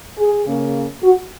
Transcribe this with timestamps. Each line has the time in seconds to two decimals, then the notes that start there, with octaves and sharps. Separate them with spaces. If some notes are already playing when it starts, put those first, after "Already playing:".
0.17 G#4
0.46 C#3 A#3 C#4
1.03 F#4